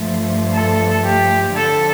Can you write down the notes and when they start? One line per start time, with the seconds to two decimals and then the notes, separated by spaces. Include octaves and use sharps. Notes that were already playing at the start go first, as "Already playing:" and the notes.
Already playing: G2 F3 A3
0.53 A4
1.05 G4
1.56 F2 D3 F3 A4